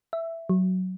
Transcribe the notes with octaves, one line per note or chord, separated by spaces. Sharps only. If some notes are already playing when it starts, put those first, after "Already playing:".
E5
F#3